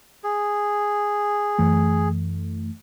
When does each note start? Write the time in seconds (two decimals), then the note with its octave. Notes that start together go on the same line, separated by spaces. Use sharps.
0.24 G#4
1.59 F#2 E3 A3